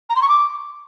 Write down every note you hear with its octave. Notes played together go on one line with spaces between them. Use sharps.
A#5
C6
C#6
D6